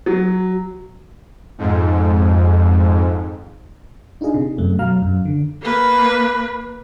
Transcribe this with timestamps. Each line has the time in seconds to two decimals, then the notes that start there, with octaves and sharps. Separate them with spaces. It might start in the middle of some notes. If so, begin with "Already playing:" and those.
0.06 F#3
1.58 F2 G#2
4.21 D4 D#4 F4 G#4 D#5
4.34 C3
4.58 F#2 A3
4.79 B2 F#3 F5 A#5 F6
5.02 F#2
5.25 D3
5.63 A#3 B4